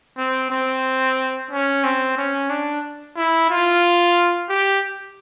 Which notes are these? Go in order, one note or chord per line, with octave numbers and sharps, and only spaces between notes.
C4
C4
C#4
C4
C#4
D4
E4
F4
G4